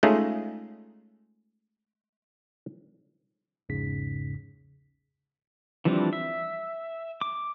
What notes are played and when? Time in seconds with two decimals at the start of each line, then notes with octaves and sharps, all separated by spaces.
0.03 G#3 A3 C#4 D#4 F4 G#4
3.69 A#1 E2 G#2 C#3 B6
5.85 E3 F3 G3 C4 D4
6.13 E5
7.21 D6